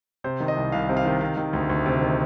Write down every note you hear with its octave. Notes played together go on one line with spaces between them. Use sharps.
C3 C5
D#3
D#5
C2
C2 F5
C3
F5
D#3
C3 F5
D#3
D2
D2
C3
D#3